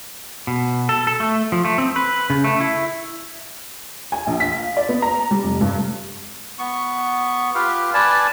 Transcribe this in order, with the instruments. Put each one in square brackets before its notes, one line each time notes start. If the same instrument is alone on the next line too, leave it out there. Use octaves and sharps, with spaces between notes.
[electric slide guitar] B2
A4
A4
A3
F3
A3
C4
B4
C#3
A3
E4
[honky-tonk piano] G#5
A#1
B6
F5
D5
B3
A#5
G3
F1
G2
[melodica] B3 C#6
F4 G4 B4 F5
B4 D5 G#5 A5